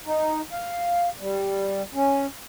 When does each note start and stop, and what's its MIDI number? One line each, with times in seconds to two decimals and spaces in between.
0.06 0.41 63
0.53 1.09 77
1.19 1.82 55
1.94 2.26 61